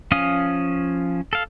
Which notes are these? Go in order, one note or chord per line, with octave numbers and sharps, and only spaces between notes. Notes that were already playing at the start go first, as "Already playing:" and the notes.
F3 C#4 F5 D#6
A4 F5